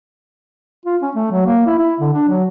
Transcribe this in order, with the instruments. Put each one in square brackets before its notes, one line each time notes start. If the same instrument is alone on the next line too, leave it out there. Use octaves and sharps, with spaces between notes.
[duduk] F4
C#4
A3
F#3
A#3
E4
E4
D3
D4
F#3